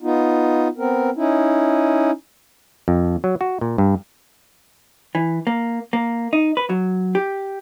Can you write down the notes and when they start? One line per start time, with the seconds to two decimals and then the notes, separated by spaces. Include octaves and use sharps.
0.02 B3 D#4 F4
0.78 B3 C4 A#4
1.16 C#4 D#4 E4
2.88 F2
3.24 F#3
3.41 F#4
3.61 A#2
3.78 G2
5.15 E3
5.47 A#3
5.93 A#3
6.33 D#4
6.57 B4
6.69 F#3
7.15 G4